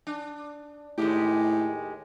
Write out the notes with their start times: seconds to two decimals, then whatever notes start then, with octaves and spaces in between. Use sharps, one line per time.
0.07 D4
0.98 D#2 A2 G#3 G4